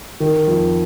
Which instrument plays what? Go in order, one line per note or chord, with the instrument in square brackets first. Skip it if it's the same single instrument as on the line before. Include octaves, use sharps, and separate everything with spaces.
[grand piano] D#3
F2